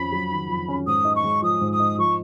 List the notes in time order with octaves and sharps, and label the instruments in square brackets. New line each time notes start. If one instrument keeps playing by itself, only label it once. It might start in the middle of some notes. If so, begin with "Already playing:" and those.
Already playing: [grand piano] F2 C#4 [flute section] B5
[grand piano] F#3
D#3
F2
C#4
[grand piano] G#2 [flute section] D#6
[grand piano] D#4
[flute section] C#6
[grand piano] G#3
[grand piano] F3 [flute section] D#6
[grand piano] G#2
[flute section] D#6
[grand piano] D#4
[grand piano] F3 [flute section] C#6